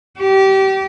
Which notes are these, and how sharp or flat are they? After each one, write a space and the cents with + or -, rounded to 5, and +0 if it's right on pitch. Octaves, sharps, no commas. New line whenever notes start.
G4 -25